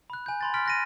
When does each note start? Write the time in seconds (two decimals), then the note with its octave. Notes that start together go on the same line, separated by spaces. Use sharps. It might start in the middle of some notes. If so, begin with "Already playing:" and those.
0.10 B5 F#6
0.26 G#5 G6
0.41 B5 C6 A6
0.54 C6 F6 A6 B6 D7
0.66 F#6 A#6 D#7